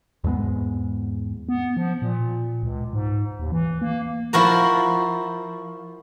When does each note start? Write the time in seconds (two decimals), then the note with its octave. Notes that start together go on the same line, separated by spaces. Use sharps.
0.24 E2 G#2 G#3 B3
1.49 B3
1.77 F3
2.02 A#2
2.63 C#2
2.93 G#2
3.40 D#2
3.52 E3
3.82 A#3
4.33 F3 E4 F#4 A#4